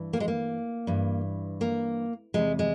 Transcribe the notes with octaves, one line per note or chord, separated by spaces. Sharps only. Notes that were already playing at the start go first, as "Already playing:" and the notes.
Already playing: G2 E3
A#3
G#3
A#3
G2 E3
A#3
E2 C3 E3 G#3
G#3